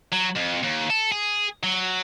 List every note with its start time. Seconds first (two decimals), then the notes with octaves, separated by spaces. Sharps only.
0.13 F#3
0.36 F2
0.63 D#2
0.90 A4
1.12 G#4
1.63 F#3